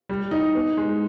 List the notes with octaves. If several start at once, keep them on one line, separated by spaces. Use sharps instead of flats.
G3
D#4
B3
G#3